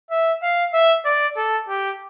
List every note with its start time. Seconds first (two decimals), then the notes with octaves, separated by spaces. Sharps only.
0.11 E5
0.43 F5
0.74 E5
1.05 D5
1.36 A4
1.68 G4